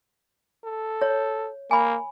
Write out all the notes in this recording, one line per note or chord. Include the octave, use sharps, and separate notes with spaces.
A4
C#5
A#3 G#5 B5